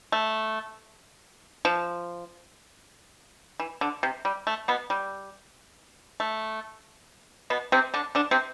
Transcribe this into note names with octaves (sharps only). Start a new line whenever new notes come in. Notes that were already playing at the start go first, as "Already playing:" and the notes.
A3
F3
E3
D3
C3
G3
A3
B2 B3
G3
A3
B2 B3
C3 C4
D3 D4
D3 D4
C3 C4